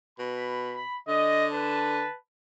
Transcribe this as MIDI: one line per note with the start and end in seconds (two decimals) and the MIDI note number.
0.19 0.80 47
0.19 0.70 83
0.73 0.96 83
1.08 2.03 50
1.08 1.45 75
1.52 2.14 71
1.52 2.14 81